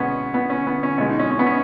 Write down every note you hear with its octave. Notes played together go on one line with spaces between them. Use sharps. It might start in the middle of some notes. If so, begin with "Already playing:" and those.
Already playing: B2 G#3 B3 C#4
B3
C#4
B3
C#4
B2 G#3 C#4
D#4
C#4
C#4
B3
C#4